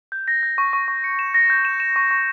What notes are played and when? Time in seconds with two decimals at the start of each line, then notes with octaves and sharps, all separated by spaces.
0.12 G6
0.28 A#6
0.43 G6
0.58 C#6
0.73 C#6
0.88 C#6
1.04 C#7
1.19 E7
1.34 A#6
1.50 G6
1.65 E7
1.80 E7
1.96 C#6
2.11 C#6